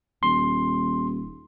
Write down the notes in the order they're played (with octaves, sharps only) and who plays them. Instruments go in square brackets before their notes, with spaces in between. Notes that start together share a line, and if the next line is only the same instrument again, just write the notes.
[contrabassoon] D#1 [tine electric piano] C6